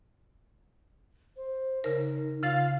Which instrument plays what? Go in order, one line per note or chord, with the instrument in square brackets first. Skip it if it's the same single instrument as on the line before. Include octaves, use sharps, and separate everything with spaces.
[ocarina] C5
[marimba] C#3 A#4 [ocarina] D#4
[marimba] C#3 A6 [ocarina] F4 [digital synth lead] F5